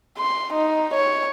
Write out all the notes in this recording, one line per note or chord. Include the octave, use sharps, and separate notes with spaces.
C6
D#4
C#5